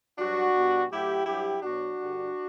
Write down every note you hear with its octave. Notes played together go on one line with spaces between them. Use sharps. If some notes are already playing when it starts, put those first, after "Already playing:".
G2 F#3 D4 F#4
B2 G3
A2 F#3 E4 G4
G2 F#3 E4 G4
B2 F#3 D4 F#4
G2 D3 G3